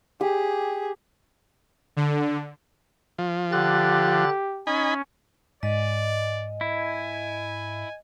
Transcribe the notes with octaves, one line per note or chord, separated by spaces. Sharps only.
G4 G#4
D3
F3
D3 G4 F#6 A6
C#4 D#4 G#5 B5
G#2 D5 D#5
E4 G#5